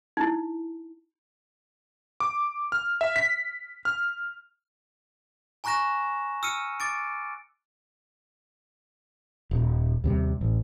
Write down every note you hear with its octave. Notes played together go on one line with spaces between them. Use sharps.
D#4 E4
D6
F6
E5
B6
F6
G#5 A#5 C#6 F#6 A#6 E7
E6 F6 C#7 D#7
D6 A6 D7
D#1
D#2 C3 G3
A1